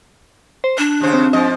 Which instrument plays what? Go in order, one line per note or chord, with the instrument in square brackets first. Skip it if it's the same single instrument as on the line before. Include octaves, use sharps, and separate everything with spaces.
[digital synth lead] C5
[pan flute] D4 [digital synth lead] F#6
[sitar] D#2 C#3 C5
[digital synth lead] C4
[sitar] G#2 F3 D#5